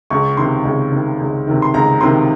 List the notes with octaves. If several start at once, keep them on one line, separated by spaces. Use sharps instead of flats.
C#2 C#6
C3 D#3 C6
C#2
C3 D#3
C#2
C3 D#3
C6
C#2 A#5
C3 D#3 C6